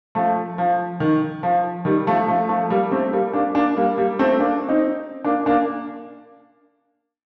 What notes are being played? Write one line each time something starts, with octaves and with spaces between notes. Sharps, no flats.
F3 A3
F3
D#3
F3
D#3 G3
F3 A3
F3 A3
F3 A3
G3 A#3
A3 C4
G3 A#3
A#3 D4
A#3 D4
G3 A#3
G3 A#3
A3 C4
A#3 D4
C4 D#4
A#3 D4
A#3 D4